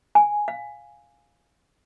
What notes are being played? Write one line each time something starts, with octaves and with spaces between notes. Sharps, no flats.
G#5
F5